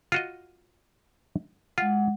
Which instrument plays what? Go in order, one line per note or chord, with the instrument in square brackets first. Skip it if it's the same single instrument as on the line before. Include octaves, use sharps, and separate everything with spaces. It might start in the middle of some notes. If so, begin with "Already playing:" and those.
[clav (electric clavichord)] F4 F#4 D#5
[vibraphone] G#3 F#5 [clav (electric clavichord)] F4